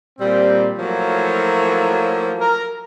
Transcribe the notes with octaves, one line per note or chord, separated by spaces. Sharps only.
A#2 G3 C4
F3 F#3 A3 A#3 E4 C#5
A#4